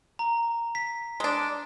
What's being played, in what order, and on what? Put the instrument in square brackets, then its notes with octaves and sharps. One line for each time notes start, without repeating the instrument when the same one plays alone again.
[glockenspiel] A#5
B6
[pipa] G#3 D4